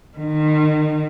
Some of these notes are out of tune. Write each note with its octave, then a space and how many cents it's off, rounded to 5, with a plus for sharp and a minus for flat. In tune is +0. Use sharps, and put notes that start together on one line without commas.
D#3 -30